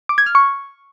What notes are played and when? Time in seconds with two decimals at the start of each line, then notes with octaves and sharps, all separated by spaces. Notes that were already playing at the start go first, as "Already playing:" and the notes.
0.09 D6
0.18 G#6
0.26 F6
0.35 C#6